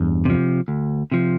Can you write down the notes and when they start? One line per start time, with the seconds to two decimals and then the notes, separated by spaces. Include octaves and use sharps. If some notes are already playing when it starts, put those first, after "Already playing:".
Already playing: E2 G2
0.25 C3 F3
0.68 D2
1.12 C3 F3